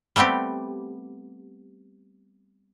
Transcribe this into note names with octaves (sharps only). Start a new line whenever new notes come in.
G3 A3 B3 C4 G4